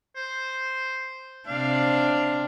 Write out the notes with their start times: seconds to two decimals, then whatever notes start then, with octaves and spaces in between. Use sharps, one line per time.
0.16 C5
1.47 C3 D4 F5